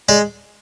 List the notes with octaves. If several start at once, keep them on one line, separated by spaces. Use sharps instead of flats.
G#3 D5